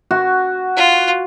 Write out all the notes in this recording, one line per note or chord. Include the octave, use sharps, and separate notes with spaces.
F#4
F4